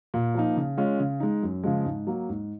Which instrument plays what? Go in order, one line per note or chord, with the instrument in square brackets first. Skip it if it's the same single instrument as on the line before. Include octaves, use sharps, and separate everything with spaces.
[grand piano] A#2
F3 A#3 D#4
C#3
G#3 C#4 F4
C#3
G#3 D#4
F#2
C#3 F3 G#3
G#2
F#3 A#3
G#2